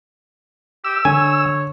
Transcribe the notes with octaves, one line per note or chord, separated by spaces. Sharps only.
G4 E6
D3 C#5 G#5